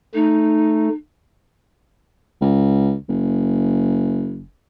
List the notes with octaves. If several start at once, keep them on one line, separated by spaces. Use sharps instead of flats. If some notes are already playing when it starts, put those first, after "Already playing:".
A3 D#4
C#2
F#1